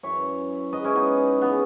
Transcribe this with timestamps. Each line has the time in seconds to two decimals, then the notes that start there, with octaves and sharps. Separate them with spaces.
0.03 F#2 E3 C#5 E5
0.72 G#2 F#3 B4 D#5
0.84 C#4 E4
0.96 B3 D#4
1.42 C#3 E3 B3